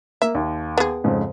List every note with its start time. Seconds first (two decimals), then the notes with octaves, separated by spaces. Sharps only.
0.22 A#3 E5
0.35 D#2
0.78 B3 G#4
1.04 F2 G#2 C#3